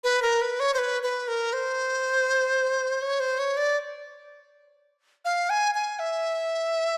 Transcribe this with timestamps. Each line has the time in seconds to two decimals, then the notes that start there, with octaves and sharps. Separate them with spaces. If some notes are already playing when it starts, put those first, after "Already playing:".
0.04 B4
0.22 A#4
0.41 B4
0.60 C#5
0.74 C5
0.78 B4
1.03 B4
1.28 A#4
1.53 C5
3.02 C#5
3.20 C5
3.39 C#5
3.57 D5
5.25 F5
5.50 G#5
5.75 G#5
5.99 E5